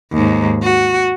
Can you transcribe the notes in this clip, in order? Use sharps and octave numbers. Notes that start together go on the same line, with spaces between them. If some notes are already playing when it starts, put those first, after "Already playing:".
D#2 G#2
F#4